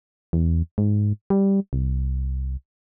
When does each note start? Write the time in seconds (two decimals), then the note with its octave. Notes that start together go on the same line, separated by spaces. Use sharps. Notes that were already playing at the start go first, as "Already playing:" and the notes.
0.33 E2
0.78 G#2
1.30 G3
1.73 C2